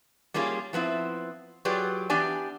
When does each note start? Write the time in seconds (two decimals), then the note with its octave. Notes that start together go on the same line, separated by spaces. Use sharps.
0.34 G3 A#3 C#4 F4 G#4
0.73 F3 B3 C4 E4
1.65 F#3 F4 G4 G#4 B4 D5
2.10 E3 B3 D4 G4 D5 G#5